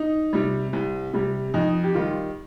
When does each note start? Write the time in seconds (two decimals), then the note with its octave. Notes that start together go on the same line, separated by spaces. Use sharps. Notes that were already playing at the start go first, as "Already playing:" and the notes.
Already playing: D#4
0.33 C3 G3
0.73 C2
1.14 C3 G3
1.54 F2 D#4
1.84 G4
1.94 D#3 G3 F4